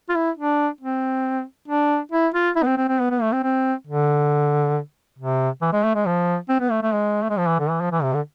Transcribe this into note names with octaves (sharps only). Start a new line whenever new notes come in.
F4
E4
D4
C4
D4
E4
F4
E4
B3
C4
C4
C4
B3
B3
A3
C4
C4
D3
C3
E3
G#3
A3
G#3
F3
C4
B3
A3
A3
G#3
A3
G#3
F3
E3
D3
E3
F3
E3
C3
D3